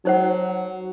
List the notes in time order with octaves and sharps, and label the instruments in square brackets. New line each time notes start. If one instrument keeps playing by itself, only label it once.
[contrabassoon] F#3 [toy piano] D#4 C5 F#5